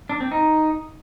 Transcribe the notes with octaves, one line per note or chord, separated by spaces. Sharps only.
D4
C4
D#4